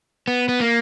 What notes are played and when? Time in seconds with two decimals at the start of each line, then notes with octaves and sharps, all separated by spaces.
0.28 B3
0.49 B3
0.60 A#3